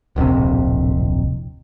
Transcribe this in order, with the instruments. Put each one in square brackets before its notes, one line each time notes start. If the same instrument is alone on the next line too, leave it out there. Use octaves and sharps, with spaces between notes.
[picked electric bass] D1 A#1 F2 C3